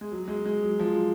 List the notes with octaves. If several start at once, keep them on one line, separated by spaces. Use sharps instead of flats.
G#3
F#3
G#3
G#3
F#3
F3